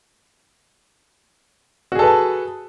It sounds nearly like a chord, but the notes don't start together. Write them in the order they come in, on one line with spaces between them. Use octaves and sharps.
F#4 G#4 A4 B4 A5